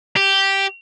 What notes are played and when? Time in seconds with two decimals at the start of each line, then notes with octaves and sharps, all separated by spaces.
0.16 G4